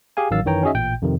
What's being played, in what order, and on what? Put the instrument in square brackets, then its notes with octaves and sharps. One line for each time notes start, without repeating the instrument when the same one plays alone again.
[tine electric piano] G4 G#4 F5 G#5
A1 D#3 F#3 F5 E6 A6
F#2 D#3 E3 C#5 G5 A#5
C#4 D#4 F#4 G#4 D#5 E5
A1 A#2 G5 G6
F2 C3 D#3